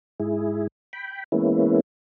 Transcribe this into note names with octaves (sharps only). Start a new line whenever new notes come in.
G#2 E4 G#4
G5 B5
E3 G#3 A#3 B3 C#4 E4